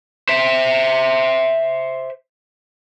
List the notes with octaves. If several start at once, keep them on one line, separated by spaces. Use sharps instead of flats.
C5 E5